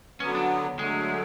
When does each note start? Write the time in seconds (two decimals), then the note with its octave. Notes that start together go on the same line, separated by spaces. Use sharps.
0.20 D3 F#3 B3 C#4
0.35 D4
0.79 D3 F#3 G#3 A3